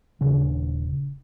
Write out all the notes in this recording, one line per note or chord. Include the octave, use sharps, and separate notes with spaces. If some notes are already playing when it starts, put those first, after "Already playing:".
D#1 C#3 D4